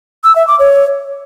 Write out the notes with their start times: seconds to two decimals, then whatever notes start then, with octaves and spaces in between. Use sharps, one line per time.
0.24 E6
0.36 E5
0.47 D6
0.59 C#5